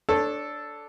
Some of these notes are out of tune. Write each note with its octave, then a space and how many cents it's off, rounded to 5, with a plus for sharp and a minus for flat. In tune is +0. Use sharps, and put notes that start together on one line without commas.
D4 +0 A4 +0 C#5 -25